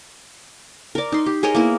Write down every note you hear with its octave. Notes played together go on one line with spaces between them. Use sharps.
A#4 D5
D#4 C6
G4
G#4 A#4 C#5 D#5
A#3 B3 E4 A#4